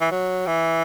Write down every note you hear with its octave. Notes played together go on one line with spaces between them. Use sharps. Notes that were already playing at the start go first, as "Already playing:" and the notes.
E3
F#3
E3